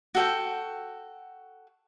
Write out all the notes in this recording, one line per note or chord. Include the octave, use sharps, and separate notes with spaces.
F#4 A4 G5